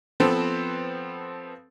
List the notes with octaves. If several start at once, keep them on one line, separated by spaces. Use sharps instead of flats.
F3 B3 C4 A4 B4 C5